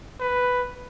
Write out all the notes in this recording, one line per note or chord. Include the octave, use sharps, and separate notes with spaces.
B4